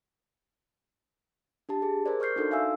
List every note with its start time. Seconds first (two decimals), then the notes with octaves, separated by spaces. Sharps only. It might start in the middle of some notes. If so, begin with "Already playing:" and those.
1.69 D4 G4 A5
1.82 G#4
2.06 A#4 C5 D5
2.20 D5 C#6 F6 G6 C7
2.36 D4 D#4 F#4 A4
2.51 E5 F5 G#5 E6